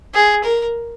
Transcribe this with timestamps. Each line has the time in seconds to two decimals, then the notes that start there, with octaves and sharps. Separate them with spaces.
0.14 G#4
0.44 A#4